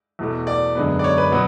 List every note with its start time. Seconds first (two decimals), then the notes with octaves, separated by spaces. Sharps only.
0.19 E2 B2 A3
0.47 D5
0.75 F#2 D3 G#3 B3
0.99 D5
1.04 C#5
1.18 B4
1.32 B2 F#3 B3